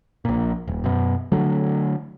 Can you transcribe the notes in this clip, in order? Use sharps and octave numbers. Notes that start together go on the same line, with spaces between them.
A#1 A#2
D#1
F#2 B2
D3 F#3 A3